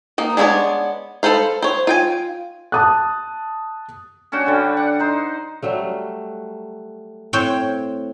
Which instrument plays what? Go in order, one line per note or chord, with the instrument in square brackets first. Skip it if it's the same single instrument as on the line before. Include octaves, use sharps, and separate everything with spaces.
[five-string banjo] A#3 D#4
G#3 B3 D4 G#4 C#5
A4 B4 C5 F5
C5 C#5
F4 G5 G#5
[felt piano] A5 D#6 F#6
[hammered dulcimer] C#4 D4 F#4 G5
D3 G3
F#5
D#4 C5
[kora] F#3 G3 A3
[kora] A2 [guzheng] C4 C#5 G5